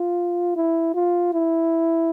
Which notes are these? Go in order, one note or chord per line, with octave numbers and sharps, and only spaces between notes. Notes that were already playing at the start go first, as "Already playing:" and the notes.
Already playing: F4
E4
F4
E4